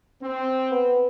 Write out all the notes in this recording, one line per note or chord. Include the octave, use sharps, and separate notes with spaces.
C4
B3